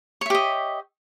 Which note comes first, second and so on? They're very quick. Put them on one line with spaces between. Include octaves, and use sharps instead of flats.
C#5 E5 G4 D#5